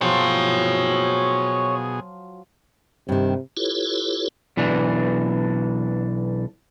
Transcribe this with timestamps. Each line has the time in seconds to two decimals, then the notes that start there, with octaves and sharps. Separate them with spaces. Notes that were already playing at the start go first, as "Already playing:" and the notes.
0.01 B2 F3 F#3 F4 G#4 C#5 G5
3.09 G2 C3 D#3
3.57 E4 F4 G4 A4 B4 C#5
4.57 B1 E3 D4